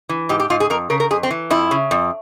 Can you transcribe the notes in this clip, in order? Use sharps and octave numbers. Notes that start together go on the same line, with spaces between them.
E3
G#2 G4
G4
G#2 F4
G#4
F2 A#4
C#3 A#4
A#4
F2 G#4
C4
E3
F2 E4
C#3
F2